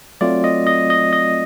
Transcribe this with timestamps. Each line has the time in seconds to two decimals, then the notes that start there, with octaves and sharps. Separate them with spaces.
0.21 F#3 A3 C4 F4 D5
0.44 D#5
0.67 D#5
0.90 D#5
1.13 D#5